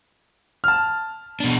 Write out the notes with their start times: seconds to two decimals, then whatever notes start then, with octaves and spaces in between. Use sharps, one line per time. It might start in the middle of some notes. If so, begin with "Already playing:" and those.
0.64 A5 F6
1.40 B2 D4